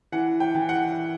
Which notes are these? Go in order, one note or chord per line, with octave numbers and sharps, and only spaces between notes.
E3 F#5
G5
E3
F#5